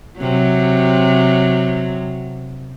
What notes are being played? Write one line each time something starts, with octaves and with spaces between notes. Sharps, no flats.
C3 F#3